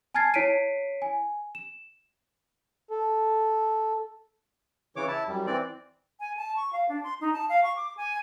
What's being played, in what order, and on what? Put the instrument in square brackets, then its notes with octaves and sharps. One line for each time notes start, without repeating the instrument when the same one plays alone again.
[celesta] G#5 A5 F6 G#6 A6 C7
E4 C#5 B6 C7 D7 D#7
G#5
E7
[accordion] A4
[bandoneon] C#3 E3 C#5 D6
E4 A5
F#2 G3
E3 C4 D5
[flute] G#5
A5
C#6
F5
D4
C6
D#4
A5
F5
C#6
D6
G#5